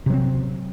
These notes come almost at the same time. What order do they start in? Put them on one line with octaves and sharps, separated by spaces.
C3 F#3 C4